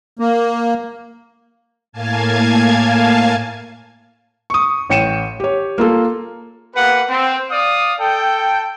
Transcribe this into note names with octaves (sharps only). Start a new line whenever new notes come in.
A#3
A2 A#3 F5 G#5 A5 G#6
C#6 D#6
A1 C#5 G5 C#7 D#7 E7
G4 C#5
A#3 F4 A4
A#3 G4 B4 F#5
C4
D5 F5 D#6
A4 G5